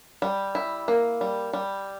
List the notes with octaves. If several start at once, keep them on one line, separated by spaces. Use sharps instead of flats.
G3
E4
A#3
G3
G3